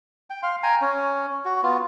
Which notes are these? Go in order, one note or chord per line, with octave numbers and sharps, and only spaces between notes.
G5
F5 C6
G5 G#5 A#5
C#4
F#4
B3 F4